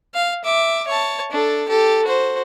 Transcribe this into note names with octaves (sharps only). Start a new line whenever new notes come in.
F5
E5 D6
C#5 A5
D4 A4
G4 A4
F#4 C5